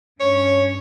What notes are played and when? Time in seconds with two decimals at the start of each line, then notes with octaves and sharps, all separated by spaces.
0.20 G2 C#4 C#5